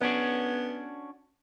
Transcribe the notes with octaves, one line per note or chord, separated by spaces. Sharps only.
B3 C#4 D4 F#4